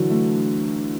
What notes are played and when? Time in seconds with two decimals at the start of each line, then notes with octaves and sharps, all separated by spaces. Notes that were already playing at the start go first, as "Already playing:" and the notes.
Already playing: D3 E3 F#3
0.10 A3